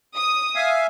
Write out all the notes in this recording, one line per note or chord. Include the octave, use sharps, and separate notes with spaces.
D#6
E5 F5 G#5